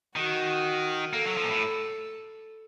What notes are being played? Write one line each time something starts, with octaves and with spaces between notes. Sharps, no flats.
D#3 F#4
A#3 A4
F#3
F3
A#2
A2